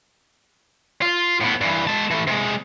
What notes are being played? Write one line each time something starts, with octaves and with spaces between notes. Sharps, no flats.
F4
A2 B3
G2 E3
G#3 A5
E3 A3
C3 G#3